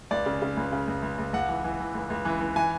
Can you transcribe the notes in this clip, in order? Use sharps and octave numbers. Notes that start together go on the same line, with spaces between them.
C#2 D5
C#3
C#3
C#2
C#3
C#2
C#2
C#2
C#2 F#5
E3
E3
E3
C#2
C#2
E3
E3
E3 G#5